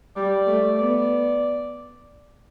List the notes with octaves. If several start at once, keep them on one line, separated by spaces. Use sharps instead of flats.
G3 D5
A3
B3 D5